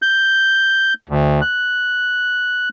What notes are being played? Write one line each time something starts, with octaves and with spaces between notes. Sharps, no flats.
G6
D2
F#6